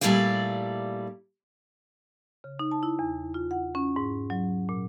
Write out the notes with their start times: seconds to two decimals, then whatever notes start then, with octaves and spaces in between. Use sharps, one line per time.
0.01 A#2 G3 A3 E4 D5 F5
2.44 C#3
2.59 D#4
2.71 A5
2.83 E4
2.99 E2
3.34 F4
3.51 F#5
3.75 C#4
3.96 G#2
4.30 F#3
4.69 A#2